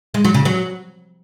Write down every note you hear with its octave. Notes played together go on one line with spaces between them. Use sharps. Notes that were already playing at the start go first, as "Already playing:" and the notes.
G#3
F#3
C#3
F#3